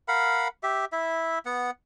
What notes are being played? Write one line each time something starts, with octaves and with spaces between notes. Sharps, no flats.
A#4 F5 F#5 B5
G4 E5
E4 E5
B3 F#5